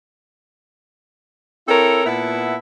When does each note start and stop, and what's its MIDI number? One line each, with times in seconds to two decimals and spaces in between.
1.68 2.04 60
1.68 2.04 64
1.68 2.04 69
1.68 2.04 70
1.68 2.04 73
2.05 2.56 46
2.05 2.56 59
2.05 2.56 64
2.05 2.56 76
2.05 2.56 78
2.05 2.56 81